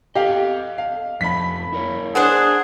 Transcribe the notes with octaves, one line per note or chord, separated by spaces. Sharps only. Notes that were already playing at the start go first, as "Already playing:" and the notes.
G4 A4 D#5 F5
F5
F2 F3 A3 B5 B6
E4 A#4 C#5
D4 G#4 C5 F#5